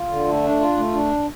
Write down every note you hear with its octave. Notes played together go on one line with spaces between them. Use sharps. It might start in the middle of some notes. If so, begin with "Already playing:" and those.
Already playing: F4
D3
A3
D4
F4
A3
D4